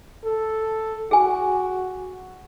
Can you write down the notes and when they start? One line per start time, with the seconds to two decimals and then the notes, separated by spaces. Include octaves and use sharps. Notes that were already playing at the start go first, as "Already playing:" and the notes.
0.24 A4
1.11 F#4 G#4 G#5